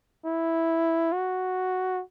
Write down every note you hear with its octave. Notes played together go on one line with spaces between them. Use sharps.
E4
F#4